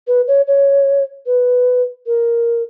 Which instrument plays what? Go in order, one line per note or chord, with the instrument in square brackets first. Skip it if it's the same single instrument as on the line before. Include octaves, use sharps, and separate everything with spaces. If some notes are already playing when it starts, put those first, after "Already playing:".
[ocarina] B4
C#5
C#5
B4
A#4